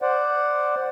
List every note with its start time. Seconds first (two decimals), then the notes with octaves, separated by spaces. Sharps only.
0.02 C5 D5 F#5